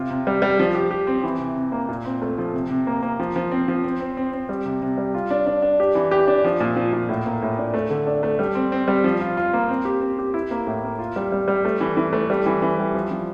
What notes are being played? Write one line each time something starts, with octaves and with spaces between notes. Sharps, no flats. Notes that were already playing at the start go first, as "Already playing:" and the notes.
Already playing: C3 F4
C3
G3
G3
F3
G4
G4
C4
E3
C3
C3
A#3
A#2
C4
A3
F3
C3
C3
A#3
A#3
F3
F3
C4
F3
C4
C4
C4
C4
G3
C3
C3
G3
F4
D4
D4
D4
G4
E3
G4
D4
F3
A#2
F3
A#2
A2
A#3
A2
D4
A3
D3
D4
A3
G3
C4
C4
G3
F3
F4
F4
A#3
C4
G4
C4
G4
E4
A#3
A2
A#3
F4
G3
G3
G3
A3
E3
E3
A3
G3
E3
E3
G3
F3
F3